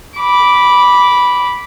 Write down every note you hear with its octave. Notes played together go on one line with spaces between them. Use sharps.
B5 D6